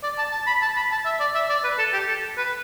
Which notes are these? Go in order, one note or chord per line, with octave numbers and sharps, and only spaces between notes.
D5
A5
A5
B5
A5
B5
A5
E5
D5
E5
D5
B4
A4
G4
A4
B4